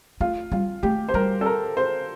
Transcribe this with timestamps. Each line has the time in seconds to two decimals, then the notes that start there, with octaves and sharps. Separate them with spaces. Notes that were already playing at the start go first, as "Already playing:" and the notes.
0.21 A3 F4
0.52 G3 F4
0.83 A3 G4
1.09 C5
1.14 G3 A#4
1.41 A4
1.46 A#4
1.77 C5